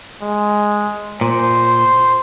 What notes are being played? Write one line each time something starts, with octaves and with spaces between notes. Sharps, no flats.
G#3
A#2 C5